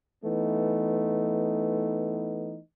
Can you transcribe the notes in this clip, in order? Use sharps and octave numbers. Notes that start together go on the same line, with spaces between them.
E3 A3 B3 D#4